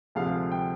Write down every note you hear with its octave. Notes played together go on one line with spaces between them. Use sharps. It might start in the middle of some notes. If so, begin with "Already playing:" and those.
D2 C3 F3 G#3 F5
G5